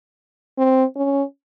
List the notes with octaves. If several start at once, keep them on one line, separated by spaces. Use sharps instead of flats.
C4
C#4